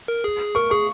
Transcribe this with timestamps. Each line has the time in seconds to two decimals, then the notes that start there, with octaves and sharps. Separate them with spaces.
0.08 A#4
0.24 G#4
0.55 A#4 C#6
0.70 G#4 C#6